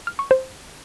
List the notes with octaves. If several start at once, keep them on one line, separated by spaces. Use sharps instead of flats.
F6
C#6
C5